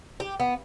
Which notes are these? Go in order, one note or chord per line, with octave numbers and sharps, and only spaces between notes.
G4
B3